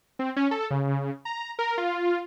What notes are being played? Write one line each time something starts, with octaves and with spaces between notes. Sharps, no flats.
C4
C#4
A4
C#3
A#5
A#4
F4